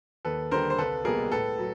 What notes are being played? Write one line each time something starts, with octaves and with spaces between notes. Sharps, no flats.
D#2 A4 B4
D3 G3 A#4 C5
C5
C2 A4 B4
B2 G3 A#3 G#4 A#4
A2 A4 B4
F#3